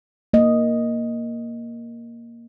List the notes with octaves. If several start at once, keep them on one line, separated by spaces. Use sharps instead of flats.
A#3 D#5